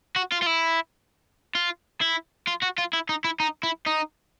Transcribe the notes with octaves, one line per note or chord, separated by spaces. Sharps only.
F#4
F4
F4
E4
F4
E4
F4
F#4
F4
E4
D#4
E4
D#4
E4
D#4